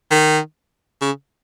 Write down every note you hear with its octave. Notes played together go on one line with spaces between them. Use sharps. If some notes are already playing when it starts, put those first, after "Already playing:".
D#3
C#3